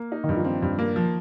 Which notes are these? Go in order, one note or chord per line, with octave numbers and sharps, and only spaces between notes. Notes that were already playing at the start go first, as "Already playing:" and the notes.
Already playing: A#3
D#4
D#3
G2
F3
C4
G2
A#3
F3